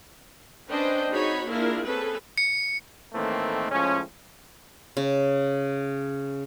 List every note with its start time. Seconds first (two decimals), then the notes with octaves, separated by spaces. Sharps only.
0.70 C#4 D4 B4 C5 D#5 G5
1.12 C4 D#4 F#4 G#4 C#5 B5
1.47 A#3 D4 E4 F4 G#4 A#4
1.85 A#3 C4 C#4 G#4 A4 B4
2.38 C#7
3.13 A2 D#3 E3 A3 A#3 C4
3.71 A2 F3 G#3 C#4
4.97 C#3